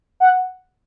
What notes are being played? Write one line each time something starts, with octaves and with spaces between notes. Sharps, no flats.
F#5